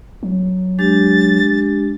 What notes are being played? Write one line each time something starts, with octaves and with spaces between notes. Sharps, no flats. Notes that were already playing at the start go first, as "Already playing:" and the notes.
F#3
G#3 D4 G4 A6